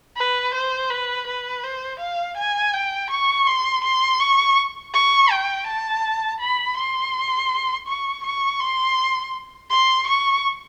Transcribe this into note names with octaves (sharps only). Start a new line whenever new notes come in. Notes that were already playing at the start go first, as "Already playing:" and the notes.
B4
C5
B4
B4
C5
F5
G#5
G5
C#6
C6
C6
C#6
C#6
G5
A5
B5
C6
C#6
C#6
C6
C6
C#6